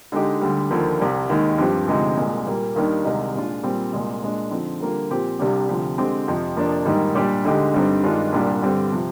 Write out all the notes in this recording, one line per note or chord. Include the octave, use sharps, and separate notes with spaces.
D3 G#3 D#4 G4
D2 D3 G3
D#2 D3 F3 A#3
C2 C3 G3
D#2 D#3 G#3
G2 F3 C4 G4
D2 C3 F3 G#3 D#4
C2 A#2 G#3
A#2 G3 A#3
D#2 D#3 G3 D4
C2 C3 D#3 G#3 D#4
A#2 G#3 D4 F4
A#2 G3 C4
C2 A#2 G#3
A#2 G#3 D4
D3 F3 C4 D#4
D3 G3 A#3 F4
A#2 F3 C4 G4
C2 C3 G3 D4 G4
D2 C3 F3
D3 G#3 C4 G4
F2 C3 F3
F2 C3 F3 A#3 D4
G#2 D#3 G3 A#3 D#4
A#2 G3 D4 G4
D2 D3 G#3 D#4 G4
G2 D3 G3 C4 D#4
G2 D#3 G#3 D4 F4
C2 A#2 G3 D4
G2 D3 G3 C4
C3 F3